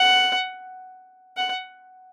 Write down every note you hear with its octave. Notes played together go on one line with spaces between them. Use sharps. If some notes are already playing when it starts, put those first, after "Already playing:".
Already playing: F#5
F#5